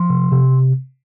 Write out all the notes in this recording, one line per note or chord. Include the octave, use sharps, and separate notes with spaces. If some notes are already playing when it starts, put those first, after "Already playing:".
Already playing: F3 C6
C3
C3